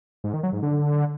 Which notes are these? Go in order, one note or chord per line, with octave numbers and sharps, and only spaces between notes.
G#2
D#3
F#3
G#2
D3